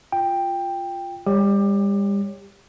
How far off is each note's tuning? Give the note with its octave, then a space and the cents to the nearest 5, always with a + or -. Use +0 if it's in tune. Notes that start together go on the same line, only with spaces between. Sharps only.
F4 +0 G5 +10
G3 +40 G4 +20 C#5 +0